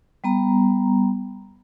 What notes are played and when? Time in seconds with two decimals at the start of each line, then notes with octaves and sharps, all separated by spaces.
0.24 G3 B3 A#5